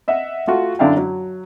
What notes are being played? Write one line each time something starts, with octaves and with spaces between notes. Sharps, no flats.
D#5 E5 F#5
A3 F4 F#4
F#2 D3 D4 E4 F5 G5
F#3